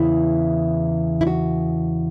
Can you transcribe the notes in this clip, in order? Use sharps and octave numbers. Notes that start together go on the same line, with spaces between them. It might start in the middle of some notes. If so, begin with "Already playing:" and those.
Already playing: E2 C#3 E3 E4
E4
F#4